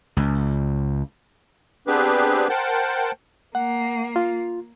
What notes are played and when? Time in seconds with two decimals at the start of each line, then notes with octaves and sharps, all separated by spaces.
0.17 C#2
1.87 B3 C4 D4 G4 G#4 B4
2.50 A#4 C5 F#5 G5 A5
3.55 A#3 F#5
4.16 F4